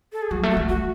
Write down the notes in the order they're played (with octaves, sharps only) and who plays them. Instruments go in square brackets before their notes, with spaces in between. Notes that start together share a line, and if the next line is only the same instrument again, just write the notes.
[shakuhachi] A4
G#4
[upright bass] F#3 [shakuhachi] F#4
[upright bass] A3
[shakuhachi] F#4
[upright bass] A3
[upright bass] A3 [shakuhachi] F#4